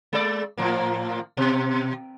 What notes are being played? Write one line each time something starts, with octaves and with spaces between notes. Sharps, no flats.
G#3 D5
A2 F3 A#3
B2